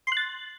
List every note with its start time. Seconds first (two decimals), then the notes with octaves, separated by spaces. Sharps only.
0.07 C6
0.12 F#6
0.17 A6